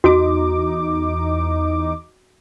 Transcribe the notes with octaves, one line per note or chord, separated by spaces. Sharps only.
E2 D#4 F#4 D6